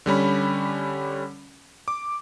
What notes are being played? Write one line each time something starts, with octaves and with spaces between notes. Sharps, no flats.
D3 G3 C#4 B5
D6